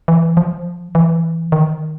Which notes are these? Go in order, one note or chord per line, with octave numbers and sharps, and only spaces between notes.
E3
F3
E3
D#3